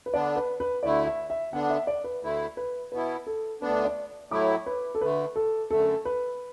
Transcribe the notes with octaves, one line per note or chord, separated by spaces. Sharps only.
B4
D3 B3 D4 D5
B4
B4
D2 D3 A3 E4 D5
E5
E5
D3 B3 D4 F#5
E5
D5
B4
D2 D3 A3 E4
B4
B2 B3 E4 B4
A4
D2 D3 B3 D4 B4
D5
A2 F#3 A3 E4 D6
B4
A4
D2 D3 A3 B4
A4
F#2 D3 A3 A4
B4